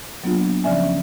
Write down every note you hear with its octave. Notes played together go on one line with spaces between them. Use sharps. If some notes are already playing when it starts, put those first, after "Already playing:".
F#3 A#3 B3 D4 F4
C#3 F3 C#4 D5 E5 G#5